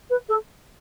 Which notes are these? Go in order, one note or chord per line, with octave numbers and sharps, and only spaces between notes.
B4
A4